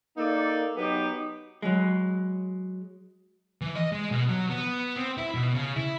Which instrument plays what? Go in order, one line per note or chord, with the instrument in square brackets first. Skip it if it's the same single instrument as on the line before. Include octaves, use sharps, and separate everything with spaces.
[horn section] A#3 D#4 A4 D5
F#3 B3 D#4 G4
[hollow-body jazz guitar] F#3 G#3
[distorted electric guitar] E3
D#5
G#3
B2
F#3
B3
C4
E4
B2
C#3
E4